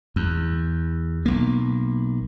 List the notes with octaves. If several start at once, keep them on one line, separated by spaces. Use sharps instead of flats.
E2
B1 A#3